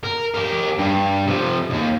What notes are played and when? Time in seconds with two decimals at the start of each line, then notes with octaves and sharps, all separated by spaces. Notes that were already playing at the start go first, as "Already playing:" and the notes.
0.04 A#4
0.35 G4 A#4
0.78 G2
1.27 C3 F3
1.70 D#2